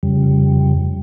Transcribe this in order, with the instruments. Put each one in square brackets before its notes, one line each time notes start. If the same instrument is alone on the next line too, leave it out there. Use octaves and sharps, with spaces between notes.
[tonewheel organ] F2 C#3 G3